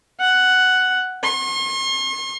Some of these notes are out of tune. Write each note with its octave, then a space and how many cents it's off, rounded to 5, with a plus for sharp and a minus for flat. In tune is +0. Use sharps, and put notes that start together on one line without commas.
F#5 +5
C6 +45